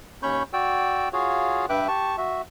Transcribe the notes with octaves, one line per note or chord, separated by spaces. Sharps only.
D#2 C#4 C#5 B5 C#6 G6
F#4 D5 G5 E6
F4 F#4 G#4 C#5 F5
G2 B4 E5 G5 D6 F#6
G4 A5 C#6
F#4 E5